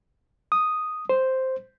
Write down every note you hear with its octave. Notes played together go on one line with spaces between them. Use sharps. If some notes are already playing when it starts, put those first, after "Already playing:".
D#6
C5